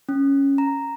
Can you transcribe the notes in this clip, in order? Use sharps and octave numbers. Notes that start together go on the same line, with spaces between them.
C#4
A#5